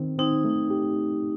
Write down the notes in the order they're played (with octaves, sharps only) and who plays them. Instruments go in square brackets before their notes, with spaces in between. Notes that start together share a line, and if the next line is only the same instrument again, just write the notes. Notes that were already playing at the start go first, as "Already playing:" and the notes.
Already playing: [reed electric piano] D#3 C4
[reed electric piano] C4 [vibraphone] D#4
[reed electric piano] A3
G4